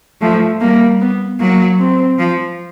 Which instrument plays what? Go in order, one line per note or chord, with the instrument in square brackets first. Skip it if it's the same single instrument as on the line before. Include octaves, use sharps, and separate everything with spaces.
[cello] F3 [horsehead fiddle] A3
[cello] G3 [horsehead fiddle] A#3
[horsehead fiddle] B3
[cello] F#3 [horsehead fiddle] A#3
[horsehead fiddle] C4
[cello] F3